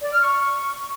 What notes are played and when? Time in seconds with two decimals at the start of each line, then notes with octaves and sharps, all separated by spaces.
0.03 D5
0.12 F6
0.22 C#6